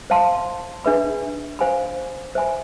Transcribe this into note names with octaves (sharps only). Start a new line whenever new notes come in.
C5 F5 A5 C6
D4 G#4 B4 E5 B5
C5 F5 G#5 B5
C5 E5 G#5 B5